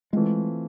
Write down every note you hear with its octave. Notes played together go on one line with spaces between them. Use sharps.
E3 G#3 A3 C4 F4